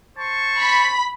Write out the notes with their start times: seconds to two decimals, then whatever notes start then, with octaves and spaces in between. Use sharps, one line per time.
0.17 C5 A5 C#6
0.61 B5